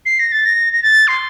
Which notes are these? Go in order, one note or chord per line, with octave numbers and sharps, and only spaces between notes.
C7
A#6
A6
A#6
A#6
A6
C6